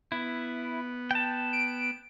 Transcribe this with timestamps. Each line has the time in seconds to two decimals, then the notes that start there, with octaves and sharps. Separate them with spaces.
0.12 B3 E4
1.11 G5 A5
1.53 D7